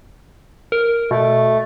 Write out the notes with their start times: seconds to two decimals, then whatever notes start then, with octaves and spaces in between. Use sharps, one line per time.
0.72 A#4
1.11 B2 A3